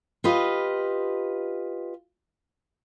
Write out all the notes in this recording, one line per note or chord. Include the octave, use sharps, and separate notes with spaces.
F4 G4 B4 D#5